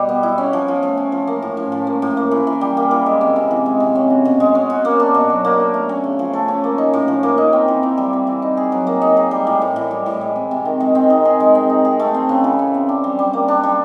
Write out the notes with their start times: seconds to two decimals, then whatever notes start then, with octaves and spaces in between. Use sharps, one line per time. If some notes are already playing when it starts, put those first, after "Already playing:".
Already playing: B2 G3
0.09 B3
0.23 E4
0.38 C#4
0.53 F3
0.68 F3
0.83 A3
0.97 C#4
1.12 F3
1.27 A#3
1.42 A2
1.57 A2
1.72 F3
1.87 A#3
2.02 A2
2.17 A#3
2.31 E3
2.47 E3
2.61 G3
2.77 A#3
2.91 E3
3.06 G#3
3.21 C3
3.36 C3
3.51 E3
3.66 G#3
3.80 C3
3.95 C#4
4.10 F#4
4.25 B2
4.40 G#3
4.55 C#4
4.70 F#4
4.85 A#3
5.00 D4
5.14 B2
5.30 F#3
5.45 A#3
5.59 D4
5.74 A3
5.89 C#4
6.04 C#3
6.19 F3
6.33 A3
6.48 C#4
6.64 A#3
6.78 D#4
6.93 A2
7.08 F3
7.23 A#3
7.38 D#4
7.53 C4
7.68 E3
7.83 E3
7.97 G3
8.13 C4
8.27 E3
8.42 D#4
8.57 G#4
8.72 F#3
8.87 A#3
9.02 D#4
9.17 G#4
9.31 G3
9.47 A2
9.62 A2
9.76 E3
9.91 G3
10.06 A2
10.21 G#3
10.36 C4
10.51 C3
10.65 D#3
10.80 G#3
10.95 C4
11.10 D#4
11.25 G#4
11.40 G#3
11.55 C4
11.69 D#4
11.85 G#4
12.00 A3
12.14 C4
12.29 C#3
12.44 E3
12.59 A3
12.74 C4
12.89 D4
13.04 G3
13.19 G3
13.33 A#3
13.48 D4
13.64 G3